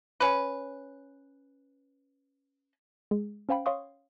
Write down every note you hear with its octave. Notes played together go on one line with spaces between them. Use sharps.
C#4 B4
G#3 G#4
C#4 C5 F5 G5 B5
C#5 F5 C6 C#6 D#6